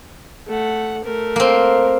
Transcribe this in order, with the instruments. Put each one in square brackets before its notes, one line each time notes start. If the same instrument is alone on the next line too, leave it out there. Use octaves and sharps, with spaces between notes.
[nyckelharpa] A3 F#5
A3 A#4
[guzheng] A#3 C4